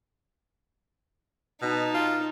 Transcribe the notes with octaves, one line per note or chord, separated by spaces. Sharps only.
B2 D#4 A5
F4